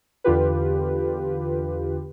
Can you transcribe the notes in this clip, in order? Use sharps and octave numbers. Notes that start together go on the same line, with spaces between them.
E2 D3 F4 G4 B4